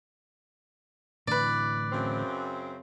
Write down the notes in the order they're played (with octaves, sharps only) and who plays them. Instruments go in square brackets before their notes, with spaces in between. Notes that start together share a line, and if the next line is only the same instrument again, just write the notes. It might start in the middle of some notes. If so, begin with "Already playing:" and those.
[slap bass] A2 D3 E3 [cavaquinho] B4 D5
[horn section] F#2 C#3 C4